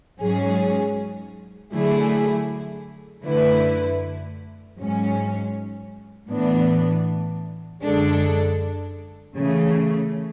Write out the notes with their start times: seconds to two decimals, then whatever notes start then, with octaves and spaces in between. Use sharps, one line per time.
0.20 G#2 F#3 C#4 G#4
1.73 D3 F#3 A3 E4 G#4
3.25 F#2 D3 A3 E4 B4
4.79 G#2 F#3 C#4
6.31 A2 E3 B3 D4
7.83 F#2 D3 G#3 D4 A4
9.36 C#3 E3 A3